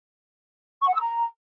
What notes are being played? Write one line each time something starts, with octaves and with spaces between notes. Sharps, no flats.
C#6
F#5
E6
A#5